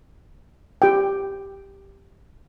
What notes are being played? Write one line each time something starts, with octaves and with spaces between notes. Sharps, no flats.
G4 G5